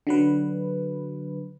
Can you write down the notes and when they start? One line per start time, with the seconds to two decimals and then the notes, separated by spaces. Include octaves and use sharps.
0.07 D3 F#3 B4